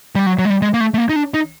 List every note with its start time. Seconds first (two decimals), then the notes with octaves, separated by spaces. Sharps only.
0.15 G3
0.26 F#3
0.39 F#3
0.45 G#3
0.50 G3
0.62 G#3
0.74 A#3
0.80 A3
0.94 A3
0.98 A#3
1.09 D#4
1.16 D4
1.34 D#4